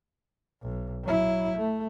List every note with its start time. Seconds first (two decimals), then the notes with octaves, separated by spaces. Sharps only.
0.62 B1
1.03 F#3 E4
1.57 A3